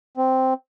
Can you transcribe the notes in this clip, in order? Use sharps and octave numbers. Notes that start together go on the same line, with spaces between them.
C4